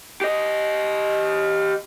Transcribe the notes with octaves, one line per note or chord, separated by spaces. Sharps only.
G4 D#5